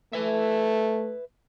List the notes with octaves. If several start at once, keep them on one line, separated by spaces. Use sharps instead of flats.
A3 B4 E5